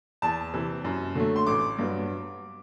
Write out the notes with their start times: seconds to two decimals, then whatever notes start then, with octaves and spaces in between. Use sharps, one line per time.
0.22 E2 A5
0.54 C3 E3
0.84 F#2
1.15 D3 F#3 A3
1.36 C6
1.47 A1 D6
1.79 G2 F#3 B3